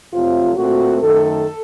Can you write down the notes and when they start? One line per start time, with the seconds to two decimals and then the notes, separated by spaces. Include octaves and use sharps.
0.12 F2 C3 F#3 A3 C4 F4
0.56 A#2 A3 C4 F#4
1.01 F#2 D#3 A3 A4